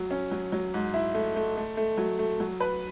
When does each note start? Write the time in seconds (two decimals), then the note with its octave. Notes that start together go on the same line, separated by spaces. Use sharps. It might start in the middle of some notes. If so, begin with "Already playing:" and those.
Already playing: F#3
0.11 C#4
0.31 F#3
0.52 F#3
0.74 G#2
0.94 E4
1.14 A3
1.36 A3
1.57 A3
1.77 A3
1.98 F#3
2.19 A3
2.40 F#3
2.60 B4